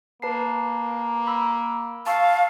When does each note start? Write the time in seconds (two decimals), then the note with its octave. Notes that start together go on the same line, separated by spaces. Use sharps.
0.22 A#3 B4 A5 C7
1.27 B5 E6
2.06 F5 A5 C#6 E6